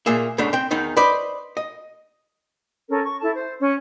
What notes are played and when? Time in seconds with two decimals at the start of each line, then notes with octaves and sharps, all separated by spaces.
0.06 A#2 A#3 G#4 E5
0.38 E2 G#2 C#3 A3 D4
0.53 C4 G5
0.71 E2 D#3 D#4
0.97 B4 C5 D5 D#5
1.57 D#5
2.89 C#4 A4 A#4
3.03 C#6
3.21 E4 A4 A5
3.34 C5
3.61 C#4